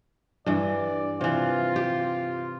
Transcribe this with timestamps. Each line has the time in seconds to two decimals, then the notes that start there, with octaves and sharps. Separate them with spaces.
0.46 G2 E3 D5
1.21 C3 E3 F4
1.76 G4